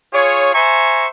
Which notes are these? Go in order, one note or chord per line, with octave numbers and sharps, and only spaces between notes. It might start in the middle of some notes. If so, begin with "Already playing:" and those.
F4 G#4 C#5
C5 E5 G#5 A#5 C#6